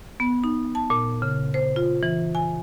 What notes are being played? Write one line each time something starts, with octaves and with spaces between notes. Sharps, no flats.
B3
D#4
A5
A#2
C#3
C5
F4
E3
G#5